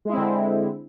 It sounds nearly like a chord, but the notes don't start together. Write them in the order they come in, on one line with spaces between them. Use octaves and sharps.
G#3 E4 C4 D3